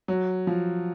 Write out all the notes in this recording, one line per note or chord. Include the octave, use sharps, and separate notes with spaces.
F#3
F3